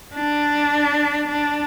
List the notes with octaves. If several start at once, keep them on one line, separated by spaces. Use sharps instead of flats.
D4
D4